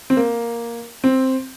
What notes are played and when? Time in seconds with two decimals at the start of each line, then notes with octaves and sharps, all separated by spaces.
0.10 C4
0.17 A#3
1.04 C4